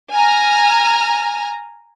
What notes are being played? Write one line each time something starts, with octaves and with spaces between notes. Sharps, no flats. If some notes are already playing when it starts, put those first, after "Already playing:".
G#5 A#5 F6